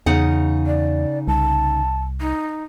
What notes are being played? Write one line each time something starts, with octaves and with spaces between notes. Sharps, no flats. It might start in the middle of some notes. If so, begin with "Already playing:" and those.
E2 C#3 D#4 F#5
D5
C2 A5
D#4